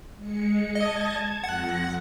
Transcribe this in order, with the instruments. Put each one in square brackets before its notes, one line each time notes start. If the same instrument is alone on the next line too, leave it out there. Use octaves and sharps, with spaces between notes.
[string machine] G#3 C#7
[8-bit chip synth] D#5 [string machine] A5 G#6
[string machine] F2 A#6 [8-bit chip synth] F#5